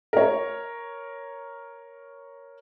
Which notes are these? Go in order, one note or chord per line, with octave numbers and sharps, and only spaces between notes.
A#4 C#5